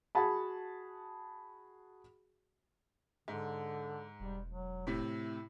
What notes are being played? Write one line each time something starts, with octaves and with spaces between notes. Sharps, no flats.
F#4 G#4 F#5 A5 B5
G#2 D3
E1 G3
F#3
A2 C3 E4